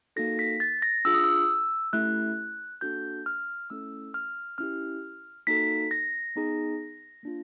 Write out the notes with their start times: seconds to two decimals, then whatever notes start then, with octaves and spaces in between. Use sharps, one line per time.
0.16 A#3 D#4 F#4 A4 A#6
0.39 B6
0.60 A6
0.82 A#6
1.05 D4 F4 G#4 E6
1.14 D#6
1.24 E6
1.93 A3 C#4 E4 G4 F#6
2.81 A#3 D4 F#4 A4 G6
3.26 F6
3.70 A3 C#4 E4 A4 E6
4.14 F6
4.58 C#4 E4 G4 F6
5.47 A#3 D#4 F#4 A4 B6
5.91 A#6
6.36 B3 D#4 G#4
7.23 A#3 D4 F4